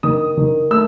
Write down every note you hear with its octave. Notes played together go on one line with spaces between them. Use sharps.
D#3 D#6
D#3
A3 E6